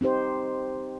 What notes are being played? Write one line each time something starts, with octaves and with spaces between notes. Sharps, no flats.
C4 D#4 G4 C5